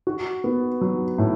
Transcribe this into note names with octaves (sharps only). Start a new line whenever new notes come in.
F#4
B3
F#3
A2